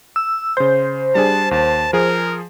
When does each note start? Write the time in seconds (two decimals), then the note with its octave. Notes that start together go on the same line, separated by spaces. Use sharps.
0.16 E6
0.57 C#3 C5 G6
1.15 G3 D4 G#4 A5
1.51 D#2 A5
1.93 F3 G#4 A#4